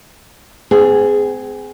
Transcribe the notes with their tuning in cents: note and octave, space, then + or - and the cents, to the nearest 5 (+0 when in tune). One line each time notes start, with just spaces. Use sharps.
C4 -40 G#4 +0